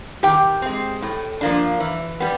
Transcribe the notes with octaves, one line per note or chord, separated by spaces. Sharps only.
D#3 G4 G5
G#3 C4
A2
F3 A#3 D4
E3
G3 B3